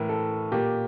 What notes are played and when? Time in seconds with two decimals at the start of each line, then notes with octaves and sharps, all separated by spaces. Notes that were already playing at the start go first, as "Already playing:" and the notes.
Already playing: A2 E3 A#4
0.09 A4
0.52 A#2 G4